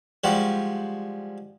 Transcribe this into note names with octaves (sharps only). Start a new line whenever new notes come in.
F3 G3 G#3 F#4